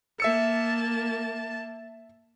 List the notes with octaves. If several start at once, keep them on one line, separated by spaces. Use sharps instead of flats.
A#3 E5 A5 E6 C#7